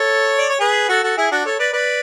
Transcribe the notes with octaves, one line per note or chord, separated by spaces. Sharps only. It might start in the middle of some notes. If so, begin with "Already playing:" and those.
Already playing: A4 C#5
D5
C#5
G#4 B4
F#4 A4
F#4 A4
E4 G#4
D4 F#4
A4 C#5
B4 D5
B4 D5